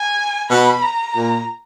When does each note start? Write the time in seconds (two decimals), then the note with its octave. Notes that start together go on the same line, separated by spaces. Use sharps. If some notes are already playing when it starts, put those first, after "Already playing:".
Already playing: G#5
0.49 B2 B5
0.82 A#5
1.16 A#2